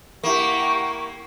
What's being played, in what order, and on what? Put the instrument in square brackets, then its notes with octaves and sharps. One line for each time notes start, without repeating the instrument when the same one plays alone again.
[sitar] A#3 E4 [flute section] G4 F#5 C#6